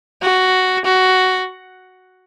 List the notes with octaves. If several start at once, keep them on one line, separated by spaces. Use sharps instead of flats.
F#4
F#4